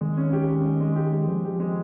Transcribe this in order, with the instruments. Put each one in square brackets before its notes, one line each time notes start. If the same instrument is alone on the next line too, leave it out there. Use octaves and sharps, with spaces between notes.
[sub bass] D#3 [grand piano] G#3
[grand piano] C#4
G4
C#4
G#3
G#3
G4
G#3
[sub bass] F3 [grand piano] G#3
[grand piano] G4
G#3